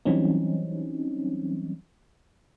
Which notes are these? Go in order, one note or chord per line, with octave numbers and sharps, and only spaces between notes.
E3 F#3 G3 C4 C#4 D#4